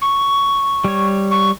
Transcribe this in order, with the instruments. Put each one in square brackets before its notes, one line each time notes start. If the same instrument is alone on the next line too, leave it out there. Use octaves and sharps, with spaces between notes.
[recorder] C#6
[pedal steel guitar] G3 C#5
[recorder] C#6